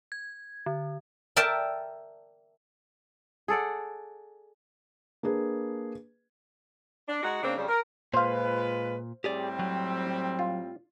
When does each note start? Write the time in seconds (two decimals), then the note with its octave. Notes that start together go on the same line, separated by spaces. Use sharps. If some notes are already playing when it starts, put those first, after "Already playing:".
0.12 G#6
0.66 D3
1.36 A#4 D5 E5 G5 A5
3.48 G#4 A4 D5 F#5
5.23 A#3 D4 G#4 B4
7.08 D4
7.23 G#3 D#4 F#4 F#5
7.42 C#3 A#3 C4 D4
7.57 F2 C#3 G3
7.68 A#4
8.14 A#2 G#3 F4 B4 C5 F5
9.24 A2 G3 C4 G4 G#4 D5
9.59 F#3
10.39 F4